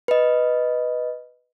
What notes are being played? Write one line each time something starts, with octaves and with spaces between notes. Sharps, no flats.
B4 D#5